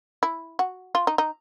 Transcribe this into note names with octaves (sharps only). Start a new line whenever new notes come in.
E4
F#4
F4
D#4
D#4